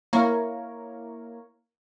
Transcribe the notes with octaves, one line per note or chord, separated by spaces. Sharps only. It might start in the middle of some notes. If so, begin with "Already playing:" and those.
A#3 E4 A#4 C#5